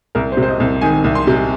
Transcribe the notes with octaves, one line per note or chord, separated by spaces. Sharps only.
C2 A#4
C5
C3
C5
D#5
C2
D#3 G#5
C2
C6
C3